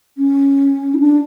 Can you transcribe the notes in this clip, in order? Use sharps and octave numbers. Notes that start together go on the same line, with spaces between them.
C#4
E4
D4